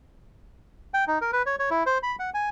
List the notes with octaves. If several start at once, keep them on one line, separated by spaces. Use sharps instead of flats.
G5
D#4
A#4
B4
C#5
C#5
E4
C5
B5
F#5
G#5